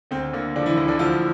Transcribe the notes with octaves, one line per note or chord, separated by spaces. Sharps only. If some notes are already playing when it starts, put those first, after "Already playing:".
D2 C4
D3 A#3
D3 F3 D4
E3 E4
D2 E3 E4
D3 D4
D2 F3 F4